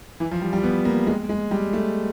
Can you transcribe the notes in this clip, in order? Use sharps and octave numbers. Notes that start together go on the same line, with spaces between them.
E3
F3
G3
G3
B3
A#3
G#3
G#3
G3
A3